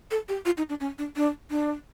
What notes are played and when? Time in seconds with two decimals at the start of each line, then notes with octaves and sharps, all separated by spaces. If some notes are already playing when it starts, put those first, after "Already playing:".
0.11 A4
0.29 G4
0.46 F4
0.58 D#4
0.69 D4
0.80 C#4
0.99 D4
1.16 D4
1.51 D4